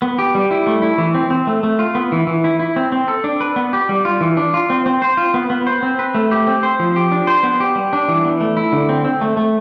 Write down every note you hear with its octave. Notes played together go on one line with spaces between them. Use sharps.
B3
G4
G3
E4
A3
E4
E3
C4
C4
A3
A3
F4
B3
E3
E3
E4
E4
C4
C4
A4
D4
B4
B3
G4
G3
F4
E3
D4
F4
C4
C4
C5
F4
B3
B3
C5
C4
B4
A3
G4
C4
C5
F3
G4
D4
C5
B3
G4
G3
D4
E3
B3
A3
E4
D3
C4
C4
A3
A3